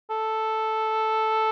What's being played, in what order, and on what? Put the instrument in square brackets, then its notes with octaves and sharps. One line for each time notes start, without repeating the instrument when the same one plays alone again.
[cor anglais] A4